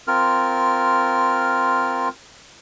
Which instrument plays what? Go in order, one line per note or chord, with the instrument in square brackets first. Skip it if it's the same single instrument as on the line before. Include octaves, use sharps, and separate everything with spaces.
[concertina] C4 F4 A#4 F6